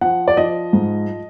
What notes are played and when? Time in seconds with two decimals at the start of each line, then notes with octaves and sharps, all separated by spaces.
0.01 F3 F#5
0.28 D5
0.37 F3 D#5
0.73 G#2